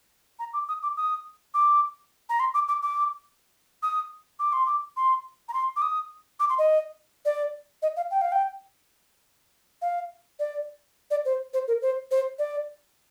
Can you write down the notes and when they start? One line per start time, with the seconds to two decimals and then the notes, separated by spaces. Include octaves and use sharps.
0.39 A#5
0.53 D6
0.69 D#6
0.83 D6
0.97 D#6
1.54 D6
2.29 A#5
2.40 C6
2.54 D6
2.68 D6
2.82 D6
3.83 D#6
4.39 D6
4.53 C6
4.66 D6
4.97 C6
5.49 A#5
5.54 C6
5.76 D6
5.82 D#6
6.40 D6
6.49 C6
6.58 D#5
7.25 D5
7.82 D#5
7.97 F5
8.11 G5
8.21 F5
8.32 G5
9.82 F5
10.39 D5
11.11 D5
11.25 C5
11.53 C5
11.68 A#4
11.82 C5
12.11 C5
12.39 D5